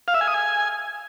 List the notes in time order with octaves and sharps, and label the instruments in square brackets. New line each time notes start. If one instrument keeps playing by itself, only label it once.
[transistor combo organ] F5
E5
G#5
D#6
G#5